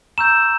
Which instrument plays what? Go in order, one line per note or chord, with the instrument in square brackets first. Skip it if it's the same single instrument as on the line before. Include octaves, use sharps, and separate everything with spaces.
[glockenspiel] A#5 C#6 E6 G6 E7